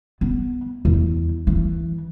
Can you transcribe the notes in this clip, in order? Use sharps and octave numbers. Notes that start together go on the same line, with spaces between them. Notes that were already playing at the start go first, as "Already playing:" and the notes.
B3
E2
E3